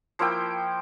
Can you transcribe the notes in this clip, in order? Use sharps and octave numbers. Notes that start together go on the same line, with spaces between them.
F3 A#3 E4 G5